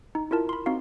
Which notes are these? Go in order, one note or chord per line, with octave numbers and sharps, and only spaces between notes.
D#4
E4 F4 A#4 A5
B5 C6
C4 D#4 F#4 F5